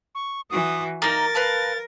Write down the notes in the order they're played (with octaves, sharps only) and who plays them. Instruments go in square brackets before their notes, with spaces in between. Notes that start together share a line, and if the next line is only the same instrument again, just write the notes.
[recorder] C#6
[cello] E3 F#4 [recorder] D#6
[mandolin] A#3 D#4 [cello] A#4 [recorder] A6
[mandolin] B4 F5 A5